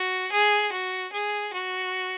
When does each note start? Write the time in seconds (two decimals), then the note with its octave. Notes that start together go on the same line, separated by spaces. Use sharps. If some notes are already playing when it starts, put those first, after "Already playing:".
Already playing: F#4
0.32 G#4
0.72 F#4
1.13 G#4
1.53 F#4